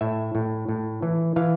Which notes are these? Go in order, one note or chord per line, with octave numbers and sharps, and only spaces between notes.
A2 E5
A2
A2
E3
E3 F5